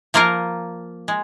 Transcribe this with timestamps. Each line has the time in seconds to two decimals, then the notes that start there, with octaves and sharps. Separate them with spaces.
0.14 F3 A#3 F4 A#4
1.08 G#3